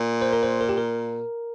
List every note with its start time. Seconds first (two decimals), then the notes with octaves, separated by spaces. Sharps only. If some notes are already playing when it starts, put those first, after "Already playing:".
Already playing: A#2
0.22 C5
0.33 A#4
0.43 C5
0.61 A#4
0.69 G4
0.77 A#4